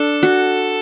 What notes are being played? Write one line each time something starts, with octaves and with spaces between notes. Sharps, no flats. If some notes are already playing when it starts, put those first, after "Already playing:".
Already playing: D4 A4
F#4